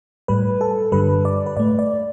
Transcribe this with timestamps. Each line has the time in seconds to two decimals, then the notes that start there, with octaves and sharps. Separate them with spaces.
0.28 A2 G3 B4
0.61 A4
0.92 G2 D3 G3 B4
1.25 D5
1.46 B4
1.57 A2 A3 D5
1.79 D5